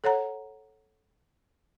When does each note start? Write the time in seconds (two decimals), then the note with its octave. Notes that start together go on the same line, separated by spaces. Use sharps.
0.04 A4 C#5 F#5 A#5